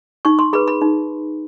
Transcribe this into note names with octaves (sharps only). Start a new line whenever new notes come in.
D#4 C#6
C6
G#4 B4 B5
B5
D#4